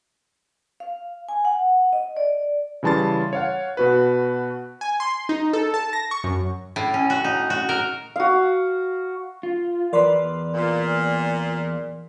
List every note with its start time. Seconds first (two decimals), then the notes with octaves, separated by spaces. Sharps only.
0.80 F5
1.29 G#5
1.45 F#5
1.93 D#5
2.17 D5
2.83 C#3 E3 G3 A5 C6 A6
3.33 C#5 F5 F#5
3.77 B2 F#4 B4
4.81 G#5
5.00 C6
5.29 D#4
5.53 A4
5.74 A5
5.93 A#6
6.11 C#6
6.24 F#2
6.76 A2
6.94 C#4
7.10 F#4
7.24 D#4
7.50 F#4
7.69 A#4
8.16 F#4 F5
9.43 F4
9.93 E2 A#4 B4 D5 C6
10.55 A#2